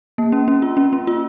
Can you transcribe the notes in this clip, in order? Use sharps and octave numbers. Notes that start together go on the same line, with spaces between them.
A#3
C#4
C#4
F4
C#4
C#4
F4